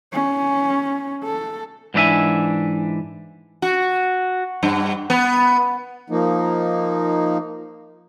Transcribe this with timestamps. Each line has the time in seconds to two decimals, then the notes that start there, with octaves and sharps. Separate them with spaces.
0.13 C#4
1.24 A4
1.94 G#2 E3 D4 E4 E5 G#5
3.62 F#4
4.63 G2
5.10 B3
6.10 F3 A#3 D#4